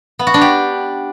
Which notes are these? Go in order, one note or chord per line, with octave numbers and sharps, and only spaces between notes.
B3
F#4
D4
G4